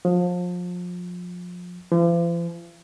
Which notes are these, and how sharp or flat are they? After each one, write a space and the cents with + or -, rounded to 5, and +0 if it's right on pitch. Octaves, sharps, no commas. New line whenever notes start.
F3 +30
F3 -45